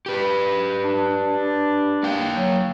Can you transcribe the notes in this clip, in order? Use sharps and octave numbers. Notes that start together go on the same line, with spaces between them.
G4 B4
D4
A#3 F5 G5
F#3